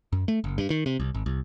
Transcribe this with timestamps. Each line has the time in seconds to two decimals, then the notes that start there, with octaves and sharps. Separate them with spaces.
0.13 F#2
0.28 A3
0.44 F#1
0.58 G2
0.70 D#3
0.86 C3
1.00 C2
1.14 G#1
1.26 C2